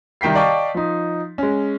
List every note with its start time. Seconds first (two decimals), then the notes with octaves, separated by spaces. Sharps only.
0.21 C2 D#3 G5 B6 C7
0.35 D5 D#5 F5 G5 A5 C#6
0.74 F3 D#4
1.38 G#3 C#4